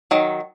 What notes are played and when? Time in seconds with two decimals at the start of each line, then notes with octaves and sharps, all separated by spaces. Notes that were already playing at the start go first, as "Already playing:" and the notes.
0.11 D#3 F#3